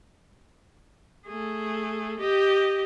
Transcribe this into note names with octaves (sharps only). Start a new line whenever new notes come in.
A3 G#4
G4 D#5